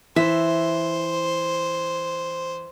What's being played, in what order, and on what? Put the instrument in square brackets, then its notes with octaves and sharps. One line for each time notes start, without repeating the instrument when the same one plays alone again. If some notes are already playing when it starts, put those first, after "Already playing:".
[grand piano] E3 [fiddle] C5 [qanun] E5